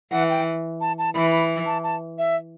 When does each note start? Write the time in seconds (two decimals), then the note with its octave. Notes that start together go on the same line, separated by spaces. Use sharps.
0.11 E3 F#5
0.30 G5
0.81 A5
0.98 A5
1.15 E3 B5
1.32 B5
1.66 A5
1.84 A5
2.18 E5